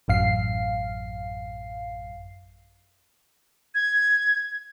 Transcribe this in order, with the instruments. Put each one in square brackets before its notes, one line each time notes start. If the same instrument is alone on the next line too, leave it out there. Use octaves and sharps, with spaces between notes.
[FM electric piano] A1 F#2 F5 C7
[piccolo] G#6